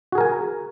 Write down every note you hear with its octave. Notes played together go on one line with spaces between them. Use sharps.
F#4 G#4 A#4 G#5